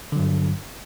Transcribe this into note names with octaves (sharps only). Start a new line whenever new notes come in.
G2 D3 F#3